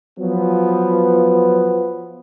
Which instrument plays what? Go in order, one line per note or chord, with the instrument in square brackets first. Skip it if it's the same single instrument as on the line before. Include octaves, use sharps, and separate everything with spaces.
[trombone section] F3 F#3 B3